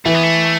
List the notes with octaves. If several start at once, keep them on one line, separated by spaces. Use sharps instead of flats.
E3 A3 E4
B3
A3